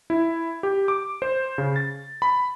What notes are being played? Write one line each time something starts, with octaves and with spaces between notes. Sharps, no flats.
E4
G4
D6
C5
C#3
A6
B5